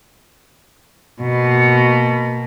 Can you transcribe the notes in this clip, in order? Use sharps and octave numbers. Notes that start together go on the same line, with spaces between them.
B2 A#3